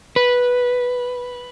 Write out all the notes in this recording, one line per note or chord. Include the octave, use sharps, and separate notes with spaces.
B4